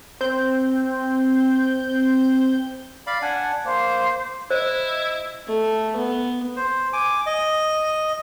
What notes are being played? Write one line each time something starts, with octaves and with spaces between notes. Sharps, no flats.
C4 G6
D5 F5 B5
D4 F#5 G#5
A#3 C5
E4 C5 D#5
A3
B3
C5
G#5 D6
D#5